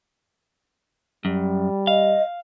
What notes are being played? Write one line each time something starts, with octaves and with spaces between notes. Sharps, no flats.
F#2 G3
D#5 F5